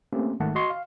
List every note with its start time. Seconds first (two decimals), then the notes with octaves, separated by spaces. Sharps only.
0.13 A3 A#3 C4 C#4 G4
0.40 G#1 D#3 G#3 A3 F#5 A5
0.55 F#4 D#5 C6 C#6
0.70 F5